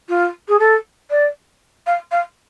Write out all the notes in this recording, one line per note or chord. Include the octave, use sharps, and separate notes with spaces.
F4
G#4
A4
D5
F5
F5